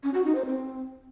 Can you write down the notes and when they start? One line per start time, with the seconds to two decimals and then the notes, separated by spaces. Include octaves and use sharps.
0.03 C#4
0.14 F#4
0.24 D#4
0.35 C5
0.45 C4